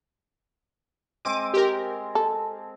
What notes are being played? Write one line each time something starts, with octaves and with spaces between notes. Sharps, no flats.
G#3 C4 D6 D#7
G4 A#4
A4